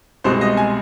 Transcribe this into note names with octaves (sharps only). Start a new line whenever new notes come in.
C2 B2 G#3 C4 C5
D#5
G#5